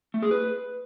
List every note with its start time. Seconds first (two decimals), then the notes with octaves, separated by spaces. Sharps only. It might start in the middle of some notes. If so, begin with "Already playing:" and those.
0.14 A3
0.23 G#4
0.31 B4